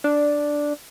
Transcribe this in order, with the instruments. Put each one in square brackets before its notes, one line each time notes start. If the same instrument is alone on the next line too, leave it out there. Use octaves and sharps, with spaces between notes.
[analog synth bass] D4